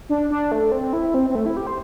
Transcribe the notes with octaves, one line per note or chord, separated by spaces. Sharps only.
D4
D4
A3
C4
E4
C4
C4
A3
E4
G4
C5